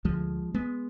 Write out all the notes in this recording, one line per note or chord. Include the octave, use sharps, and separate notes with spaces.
D2 D3 F3 G#3
G#3 B3